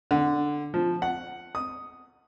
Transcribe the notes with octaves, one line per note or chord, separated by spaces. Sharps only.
D3
F3
F#5
D#6